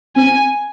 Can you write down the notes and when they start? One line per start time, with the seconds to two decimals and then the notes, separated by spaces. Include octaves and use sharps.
0.16 C4 G#5